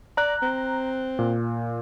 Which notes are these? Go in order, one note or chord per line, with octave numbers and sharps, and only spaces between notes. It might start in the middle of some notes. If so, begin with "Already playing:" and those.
D5 A#5 F#6
C4
A#2